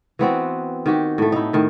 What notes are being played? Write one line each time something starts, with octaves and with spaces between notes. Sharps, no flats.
E3 B3 C4 F#4
D#3 F#4 G4
A2 A3
D#4 E4
A2 D#3